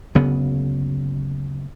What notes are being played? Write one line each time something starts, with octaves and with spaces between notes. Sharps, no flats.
F#1 D2 C#3 B3